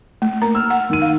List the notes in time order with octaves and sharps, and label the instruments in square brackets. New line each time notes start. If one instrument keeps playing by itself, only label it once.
[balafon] A3
[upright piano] A#3 [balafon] A#5
[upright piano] E6 F6
[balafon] F#5
[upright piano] D#3 D#7
[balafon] F5